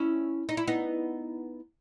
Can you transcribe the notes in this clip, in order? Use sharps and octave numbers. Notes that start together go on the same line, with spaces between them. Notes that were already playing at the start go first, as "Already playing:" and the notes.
Already playing: C#4 E4
D#4
E4
B3 D#4